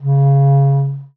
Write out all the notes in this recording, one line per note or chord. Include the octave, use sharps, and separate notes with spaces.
C#3